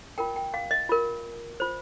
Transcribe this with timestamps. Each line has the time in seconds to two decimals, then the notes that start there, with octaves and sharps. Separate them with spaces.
0.18 F4 A#4 G5
0.36 G5
0.54 F5
0.71 D#5
0.89 F4 A#4
1.60 F4 C5